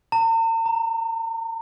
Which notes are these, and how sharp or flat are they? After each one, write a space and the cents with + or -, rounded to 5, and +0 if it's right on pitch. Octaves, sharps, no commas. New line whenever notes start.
A#5 -45
A#5 +5